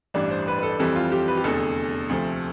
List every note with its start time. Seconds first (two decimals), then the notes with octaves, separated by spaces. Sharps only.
0.14 A1 G2 E3 G3 D4 D5
0.31 C5
0.48 B4
0.58 B4
0.63 A4
0.79 F2 E3 G3 C4 A4
0.96 F4
1.12 G4
1.28 B4
1.37 G4
1.44 F1 E2 D3 A4
2.09 D2 C3 F3 A3